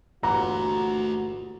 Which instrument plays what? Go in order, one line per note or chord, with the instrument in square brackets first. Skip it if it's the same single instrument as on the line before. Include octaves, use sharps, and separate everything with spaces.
[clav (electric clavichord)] G1 A#2 E3 [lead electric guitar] A3 F#5 [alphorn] F#4 [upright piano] A#5